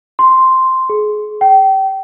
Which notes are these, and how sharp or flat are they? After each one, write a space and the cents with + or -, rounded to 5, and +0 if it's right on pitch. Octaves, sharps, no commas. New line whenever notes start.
C6 +0
G#4 +25
G5 -30